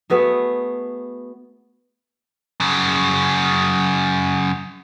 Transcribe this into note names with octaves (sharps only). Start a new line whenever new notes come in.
A3 B3 F#4 G#4
F#2 C#3